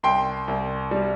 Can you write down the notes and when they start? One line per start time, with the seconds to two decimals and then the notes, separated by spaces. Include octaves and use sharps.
0.03 C2 G5 C6
0.48 C2
0.91 G3